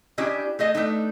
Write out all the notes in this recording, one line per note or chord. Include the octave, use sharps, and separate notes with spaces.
C#4 D4 E4 G4 D#5
A3 G#4 D#5 A5
A3 B3 D4 D#4